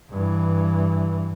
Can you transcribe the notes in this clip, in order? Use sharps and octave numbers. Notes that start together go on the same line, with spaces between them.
G2 E3